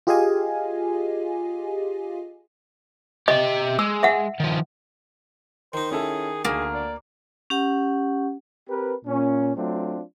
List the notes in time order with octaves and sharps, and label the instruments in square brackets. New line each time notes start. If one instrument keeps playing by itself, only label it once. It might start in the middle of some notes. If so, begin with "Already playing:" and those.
[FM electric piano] F4 G4 G#4 D#5 F5 G#5
[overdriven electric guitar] G4 E5 [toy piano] D#5
[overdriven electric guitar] G#3 [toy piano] E6
[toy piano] E5 F#5
[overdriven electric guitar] D#3 F3
[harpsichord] D#3 D#4 [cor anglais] C5
[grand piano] C#4 E4 A4 [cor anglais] G#4
[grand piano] D2 [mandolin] A#3 [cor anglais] G#4
[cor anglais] D5
[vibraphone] C#4 G4 F#5
[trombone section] C4 G4 A#4 B4
A#2 C#4
F#3 A3 C4 D4 F4